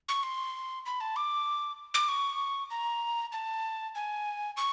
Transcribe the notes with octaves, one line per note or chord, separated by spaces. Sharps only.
C#6
C6
B5
A5
D6
D6
C#6
A#5
A5
G#5
C#6